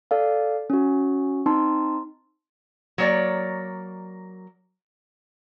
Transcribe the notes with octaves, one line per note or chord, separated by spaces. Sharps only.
A4 D5 F5
C#4 F#4
C4 D#4 A5 C6
F#3 A#3 C#5 D5